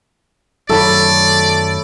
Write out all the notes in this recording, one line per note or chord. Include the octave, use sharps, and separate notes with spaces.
F#2 D#3 F#3 A3 A4 C#5 D5 B5